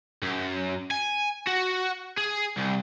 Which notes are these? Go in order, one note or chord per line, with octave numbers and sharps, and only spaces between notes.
F#2
G#5
F#4
G#4
C2